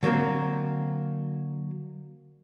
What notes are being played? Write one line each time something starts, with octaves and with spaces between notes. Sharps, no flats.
D3 F#3 A#3 C4 A#4